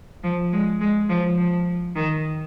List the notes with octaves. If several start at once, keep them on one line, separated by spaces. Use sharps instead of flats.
F3
G#3
G#3
F3
F3
D#3